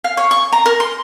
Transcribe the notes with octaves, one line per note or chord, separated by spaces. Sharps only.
F5
C#5
C#6
A#5
A#4
C6